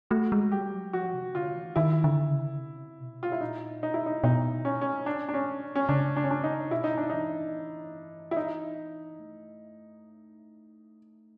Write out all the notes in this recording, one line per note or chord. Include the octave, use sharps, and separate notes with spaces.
A3 F#4
G#3
G3 G4
F#3
F3 F#4
C3
D3 F4
E3
D#3 E4
D3
C#3
C3
B2
F4
E4
A#2 D#4
B2 D#4
E4
D#4
B2 D#4
C#4
C#4
D4
D4
C#4
C#4
C#3 D4
D4
C#4
D4
D#4
B2 E4
D#4
D4
E3 D#4
E4
D#4
A3